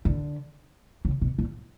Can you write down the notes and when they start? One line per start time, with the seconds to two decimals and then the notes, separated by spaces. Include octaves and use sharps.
0.05 D3
1.05 C#3
1.21 B2
1.39 A#2